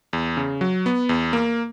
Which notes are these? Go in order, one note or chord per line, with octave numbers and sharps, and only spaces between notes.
E2
C#3
F#3
B3
E2
A#3